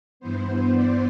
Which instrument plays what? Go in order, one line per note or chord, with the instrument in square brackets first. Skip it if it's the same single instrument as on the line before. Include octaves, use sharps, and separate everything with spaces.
[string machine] G2 E3 B3 C5
D5